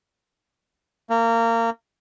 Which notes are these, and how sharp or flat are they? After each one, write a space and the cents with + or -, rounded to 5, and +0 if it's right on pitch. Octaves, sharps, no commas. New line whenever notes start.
A#3 -25